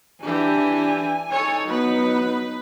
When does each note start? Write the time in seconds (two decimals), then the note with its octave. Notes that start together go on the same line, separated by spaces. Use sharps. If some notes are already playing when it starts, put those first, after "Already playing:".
0.24 E3 D4 G4 G#5
1.33 D#4 A4 C#5
1.67 F#3 B3 B4